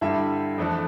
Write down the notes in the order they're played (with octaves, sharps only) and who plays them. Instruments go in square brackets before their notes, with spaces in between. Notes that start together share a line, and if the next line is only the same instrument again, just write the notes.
[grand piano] G2 D3 G3 [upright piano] E4 E5
[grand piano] F2 E3 A3 D4 A4